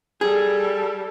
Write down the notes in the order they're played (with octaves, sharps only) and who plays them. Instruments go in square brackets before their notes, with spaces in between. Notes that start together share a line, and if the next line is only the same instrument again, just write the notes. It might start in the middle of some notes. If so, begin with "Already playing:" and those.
[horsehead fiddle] G3 A4 [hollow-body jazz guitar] G#4